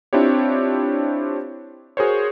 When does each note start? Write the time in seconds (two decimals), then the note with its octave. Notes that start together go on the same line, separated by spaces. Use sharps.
0.13 C4 D4 E4 F4 G4 C#5
1.97 F#4 G#4 A#4 C5 C#5